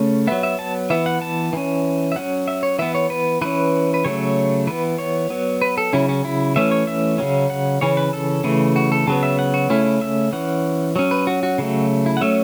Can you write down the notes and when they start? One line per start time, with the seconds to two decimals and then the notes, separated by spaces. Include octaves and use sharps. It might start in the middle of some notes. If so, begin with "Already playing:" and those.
Already playing: C#3 A3 C#4
0.27 F#3 B3 E5
0.43 E5
0.59 A5
0.90 E3 B3 E5
1.06 F#5
1.22 A5
1.53 E3 C#4
2.12 E5
2.16 F#3 C#4 F#5
2.48 E5
2.63 C#5
2.79 E3 B3 E5
2.95 C#5
3.10 B4
3.41 E3 C#4 B4
3.94 B4
4.04 C#3 F#3 A3 C#5
4.67 E3 B3 B4
4.98 C#5
5.30 F#3 B3
5.62 B4
5.78 A4
5.93 C#3 F#3 C#4 E4
6.09 C#4
6.25 E4
6.56 E3 A3 C#4 E5
6.71 C#5
6.87 E5
7.18 C#3 F#3 C#4
7.50 F#5
7.81 C#3 E3 C#4 C#5
7.97 B4
8.13 A4
8.44 C#3 E3 A3
8.76 F#4
8.92 A4
9.07 C#3 F#3 B3 A5
9.23 E5
9.39 F#5
9.54 F#4
9.70 C#3 A3 C#4 E4
9.85 E4
10.01 E5
10.33 E3 C#4 F#5
10.96 F#3 C#4
11.11 B4
11.27 F#4
11.43 F#4
11.58 C#3 F#3 A3
12.06 E4
12.17 F#5
12.21 F#3 A3 C#4 E5